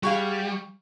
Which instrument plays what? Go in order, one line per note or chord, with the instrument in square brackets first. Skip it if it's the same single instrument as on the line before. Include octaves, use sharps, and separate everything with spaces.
[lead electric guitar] G3 [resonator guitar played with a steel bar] F#4 G#4 F5